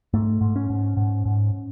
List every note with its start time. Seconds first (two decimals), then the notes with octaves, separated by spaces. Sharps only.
0.14 G#2 A3
0.41 G#2
0.56 C#4
0.70 G#2
0.97 G#2
1.25 G#2